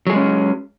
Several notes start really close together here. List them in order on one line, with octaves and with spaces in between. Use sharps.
F#3 G#4 G#3 C#4